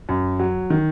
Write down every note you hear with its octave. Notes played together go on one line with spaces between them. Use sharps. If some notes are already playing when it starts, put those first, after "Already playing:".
F#2
F#3
D#3